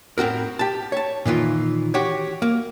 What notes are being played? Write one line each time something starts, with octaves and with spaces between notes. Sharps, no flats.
A2 C4 F#4 A#4
G4 A5
C#5 A5
A#2 D#3 E3 F4
F#4 G4 C#5
A#3